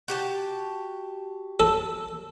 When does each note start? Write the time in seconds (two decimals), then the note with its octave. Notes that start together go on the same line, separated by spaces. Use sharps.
0.08 F#4 G4 A5
1.60 A4